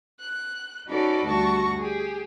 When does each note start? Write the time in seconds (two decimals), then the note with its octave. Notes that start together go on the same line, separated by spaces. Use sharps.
0.19 F#6
0.88 C#4 D#4 F#4 A4 B4 D5
1.26 D2 G3 F#4 A5 C#6 A#6
1.77 G4 G#4